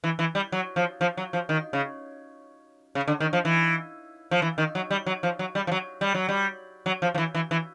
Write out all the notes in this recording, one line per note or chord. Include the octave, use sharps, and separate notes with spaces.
E3
E3
G3
F#3
F3
F3
F#3
F3
D#3
C#3
C#3
D3
D#3
F3
E3
F3
E3
D#3
F#3
G3
F#3
F3
F#3
G3
F3
F#3
G3
F#3
G3
F#3
F3
F3
E3
E3
E3